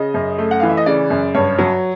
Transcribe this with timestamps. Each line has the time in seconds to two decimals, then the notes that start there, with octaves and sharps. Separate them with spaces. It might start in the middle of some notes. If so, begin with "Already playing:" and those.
Already playing: C#3 D#5
0.14 F#2
0.38 A3
0.51 F#5
0.60 E3 F5
0.69 E5
0.77 D#5
0.86 C#3 D5
1.10 F#2
1.35 G2 C#5
1.59 F#3